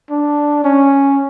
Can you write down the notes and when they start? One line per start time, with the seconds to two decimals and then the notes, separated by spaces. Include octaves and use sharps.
0.10 D4
0.64 C#4